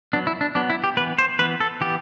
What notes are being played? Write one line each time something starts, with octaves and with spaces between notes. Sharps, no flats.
F#3 B3 D4
E4
D4
F#3 B3 D4
E4
G4
E3 B3 B4
C5
E3 B3 B4
A4
E3 B3 G4